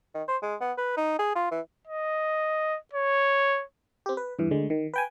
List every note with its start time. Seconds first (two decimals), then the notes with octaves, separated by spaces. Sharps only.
0.14 D#3
0.28 C5
0.42 G#3
0.61 B3
0.77 B4
0.97 D#4
1.19 G#4
1.35 F4
1.51 E3
1.87 D#5
2.93 C#5
4.06 C4 G4
4.17 B4
4.39 E2 G2 E3
4.51 D2 D3 G#3
4.70 D#3
4.94 B4 G5 G#5